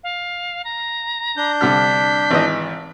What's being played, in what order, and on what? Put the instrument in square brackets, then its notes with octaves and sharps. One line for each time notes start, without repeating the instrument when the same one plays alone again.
[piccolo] F5
A#5
[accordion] D4 G6
[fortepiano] C2 D3 F6 [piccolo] B6
[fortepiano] G#1 E3 D#5